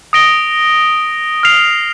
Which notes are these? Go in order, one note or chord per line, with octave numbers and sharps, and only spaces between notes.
D#6 A#6 D7 G7
F6 C7 F7